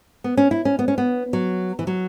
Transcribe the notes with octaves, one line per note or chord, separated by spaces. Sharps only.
B3
C#4
E4
C#4
B3
C#4
B3
F#3
E3
F#3